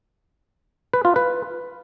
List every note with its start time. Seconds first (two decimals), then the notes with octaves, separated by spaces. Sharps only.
0.94 B4
1.05 F4
1.16 B4